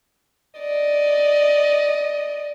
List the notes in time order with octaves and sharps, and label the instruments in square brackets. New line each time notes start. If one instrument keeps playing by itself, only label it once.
[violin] D5 D#5